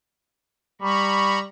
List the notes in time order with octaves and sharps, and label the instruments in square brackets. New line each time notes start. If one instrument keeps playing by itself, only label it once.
[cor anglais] G3 [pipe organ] A#5 B5 C#6